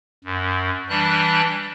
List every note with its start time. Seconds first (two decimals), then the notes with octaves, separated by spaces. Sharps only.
0.25 F#2
0.89 E3 G3 D4 F#6